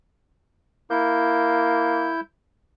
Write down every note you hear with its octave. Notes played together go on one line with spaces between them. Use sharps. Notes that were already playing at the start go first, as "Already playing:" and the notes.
A#3 E4 G6